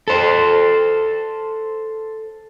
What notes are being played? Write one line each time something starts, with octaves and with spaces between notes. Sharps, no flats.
A4 C5